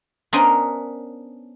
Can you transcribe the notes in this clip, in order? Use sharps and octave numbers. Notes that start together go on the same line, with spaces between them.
B3 C#4 D4 A#4 C5 D#5